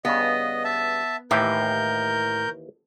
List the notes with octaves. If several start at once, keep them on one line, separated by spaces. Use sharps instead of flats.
G2 C#3 B3 D#5
E5 A5
D#2 A2 E3 G4 A#4 G6